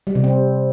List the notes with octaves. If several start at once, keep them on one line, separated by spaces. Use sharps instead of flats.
G3
C3
C4